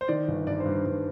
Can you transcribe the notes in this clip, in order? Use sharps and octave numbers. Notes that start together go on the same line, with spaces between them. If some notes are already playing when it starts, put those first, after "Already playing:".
C5
D#3 D5
G1
G2 D5
C5
G2
G2